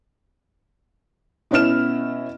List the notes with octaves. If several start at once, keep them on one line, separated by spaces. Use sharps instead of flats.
B2 B3 C#4 E4 F6 E7